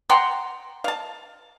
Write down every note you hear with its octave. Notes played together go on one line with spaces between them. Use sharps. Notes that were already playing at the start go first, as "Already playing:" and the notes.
F#5 G5 A#5 C6
F5 A5